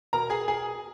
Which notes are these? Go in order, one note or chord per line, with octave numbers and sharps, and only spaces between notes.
B2 A#4 A#5
G#4 G#5
G#4 G#5